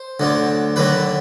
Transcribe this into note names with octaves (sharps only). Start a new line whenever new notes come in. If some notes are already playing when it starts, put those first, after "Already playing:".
Already playing: C5
D2 D3 F#3
D#2 D3 F#3 B4